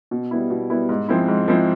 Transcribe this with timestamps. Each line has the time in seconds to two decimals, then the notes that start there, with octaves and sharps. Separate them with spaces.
0.11 B2
0.31 G3 B3 E4
0.50 B2
0.70 G3 B3 E4
0.89 G#2
1.09 F3 G#3 C4 E4
1.28 G#2
1.48 F3 G#3 C4 E4